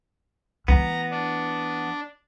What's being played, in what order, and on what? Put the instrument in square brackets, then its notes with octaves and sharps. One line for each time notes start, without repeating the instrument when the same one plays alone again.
[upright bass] E3 A3 [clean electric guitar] B3 [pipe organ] A#5
[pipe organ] D4